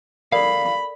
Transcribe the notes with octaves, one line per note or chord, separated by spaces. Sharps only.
A4 A#4 D5 F5 B5